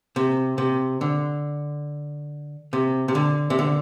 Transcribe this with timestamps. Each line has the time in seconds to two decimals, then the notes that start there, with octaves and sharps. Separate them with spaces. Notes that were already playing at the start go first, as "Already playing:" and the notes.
0.16 C3
0.58 C3
1.01 D3
2.73 C3
3.08 C3
3.15 D3
3.50 C3
3.59 D3